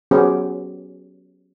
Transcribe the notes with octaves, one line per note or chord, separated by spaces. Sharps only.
F#3 B3 C#4 G4 G#4 C5